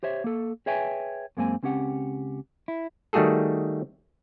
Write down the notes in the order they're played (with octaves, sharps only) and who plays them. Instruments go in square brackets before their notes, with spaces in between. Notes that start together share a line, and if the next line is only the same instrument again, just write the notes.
[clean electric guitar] G4 C5 C#5 E5
A#3 A4
G#4 B4 C#5 E5 G5 G#5
F#2 G#3 A#3 C4 G#5
C#2 C4 C#4 G4 F#5
E4
[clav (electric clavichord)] D#3 G3 A3 F#4 G#4 A4